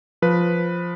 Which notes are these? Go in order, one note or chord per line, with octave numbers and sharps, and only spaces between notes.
F3 B4